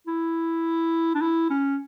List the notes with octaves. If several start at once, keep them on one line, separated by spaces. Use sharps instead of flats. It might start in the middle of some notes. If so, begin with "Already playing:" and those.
E4
D4
E4
C#4